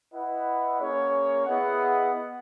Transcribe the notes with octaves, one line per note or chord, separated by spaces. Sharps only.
E4 B4 D#5 F#5
A#3 C#4 G#4 C#5
B3 E4 G#4 D#5 F#5